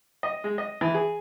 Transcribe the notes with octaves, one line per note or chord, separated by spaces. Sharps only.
D#5
G#3
D#5
E3
G#4